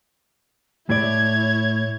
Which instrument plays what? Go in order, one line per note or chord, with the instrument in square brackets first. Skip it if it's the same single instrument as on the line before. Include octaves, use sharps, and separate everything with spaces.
[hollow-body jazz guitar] A2 D5 [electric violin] E4 C#5 [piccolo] G#6